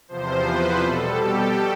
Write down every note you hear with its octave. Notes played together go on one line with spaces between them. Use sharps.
E2 C3 F3 C5
B4
B2 G3 A4
G4